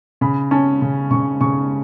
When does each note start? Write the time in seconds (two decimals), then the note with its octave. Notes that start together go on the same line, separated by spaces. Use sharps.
0.21 C#3 B5
0.51 C#4 A5
0.81 C#3
1.11 C#3 C#6
1.41 C#3 C#6